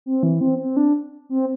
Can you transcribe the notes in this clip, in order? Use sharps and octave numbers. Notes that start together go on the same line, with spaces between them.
C4
E3
C4
C4
D4
C4